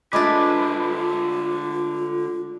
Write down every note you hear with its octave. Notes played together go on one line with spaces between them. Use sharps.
D3 G#3 A3 D4 F4 B4 D6